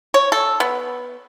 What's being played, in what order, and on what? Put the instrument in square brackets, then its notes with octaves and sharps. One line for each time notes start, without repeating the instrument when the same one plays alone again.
[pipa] C#5
A4
B3